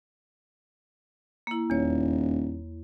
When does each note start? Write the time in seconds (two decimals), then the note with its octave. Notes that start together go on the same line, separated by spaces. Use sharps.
1.47 A#3 E4
1.70 D#1 E2 C#5